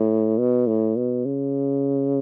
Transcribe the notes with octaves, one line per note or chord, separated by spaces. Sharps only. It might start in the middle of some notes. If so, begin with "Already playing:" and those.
Already playing: A2
B2
A2
B2
C#3